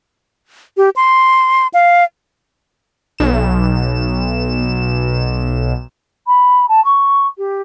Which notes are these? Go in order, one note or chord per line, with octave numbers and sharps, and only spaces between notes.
G4
C6
F5
B1 E7
B5
A5
C#6
G4